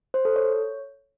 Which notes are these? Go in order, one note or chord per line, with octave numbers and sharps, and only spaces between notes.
C5
A4
C#5